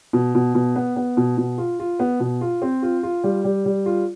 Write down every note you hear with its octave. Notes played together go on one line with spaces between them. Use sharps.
B2
B2
B2
B3
B3
B2
B2
F4
F4
B3
B2
F4
C4
F4
F4
G3
G3
G3
F4